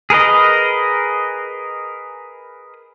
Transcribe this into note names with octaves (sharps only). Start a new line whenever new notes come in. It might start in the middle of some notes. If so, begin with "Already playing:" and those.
G#4 A#4 B4 D#5